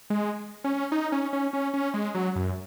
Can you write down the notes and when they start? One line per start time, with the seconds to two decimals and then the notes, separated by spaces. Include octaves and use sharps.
0.10 G#3
0.64 C#4
0.92 D#4
1.12 C#4
1.33 C#4
1.53 C#4
1.74 C#4
1.94 G#3
2.15 F#3
2.36 F#2